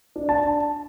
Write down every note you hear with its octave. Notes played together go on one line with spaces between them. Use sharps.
D4
A5